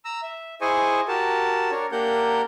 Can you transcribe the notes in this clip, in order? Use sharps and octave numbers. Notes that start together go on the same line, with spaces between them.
A#5 E6
E5
E4 G#4 C5 D#5 G#5 C#6
F#4 G4 A#4 A5
D4 A#4 C#5
A#3 D4 G4 A#4 F#5 G6